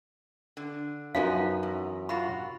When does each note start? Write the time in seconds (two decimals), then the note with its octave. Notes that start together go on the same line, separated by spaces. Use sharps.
0.57 D3
1.15 F#2 F3 B3 D#4 F5
1.63 E2
2.09 C3 F4 F#4 B5